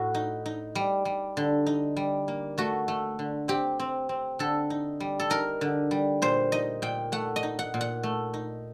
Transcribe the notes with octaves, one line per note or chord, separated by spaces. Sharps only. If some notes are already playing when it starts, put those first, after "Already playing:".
Already playing: A2 F#4
D#4
D#4
G3
G3
D3
D#4
G3
A#3
A3 F#4
A3
D3
C4 G4
C4
C4
D3 A4
D#4
G3
A4
D#4 A#4
D3
G3
A#2 C5
D#4 D#5
A#2 G5
A3 F#5
D#5
D#4
F#5
A#2
F#5
A3
D#4